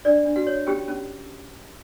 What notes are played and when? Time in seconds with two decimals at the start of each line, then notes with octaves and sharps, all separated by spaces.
0.05 D4 D5
0.25 D4
0.36 F#4 F#5
0.47 C#5
0.67 C#4 G4 G5
0.88 C#4